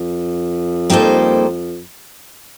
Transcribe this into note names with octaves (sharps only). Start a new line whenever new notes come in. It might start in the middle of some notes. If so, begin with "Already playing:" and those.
Already playing: F2
G3 A#3 D#4 A4 C5